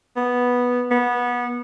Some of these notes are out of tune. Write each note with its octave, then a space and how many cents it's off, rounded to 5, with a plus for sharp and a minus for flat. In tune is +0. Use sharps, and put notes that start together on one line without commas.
B3 -5
B3 -20